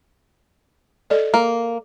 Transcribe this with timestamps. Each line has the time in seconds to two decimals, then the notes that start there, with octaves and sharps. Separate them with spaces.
1.10 A4 D5 D#5
1.34 A#3